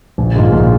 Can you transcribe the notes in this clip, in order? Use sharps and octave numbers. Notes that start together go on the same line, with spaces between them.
A#1
G#2 D#3 A#3 F4
A#1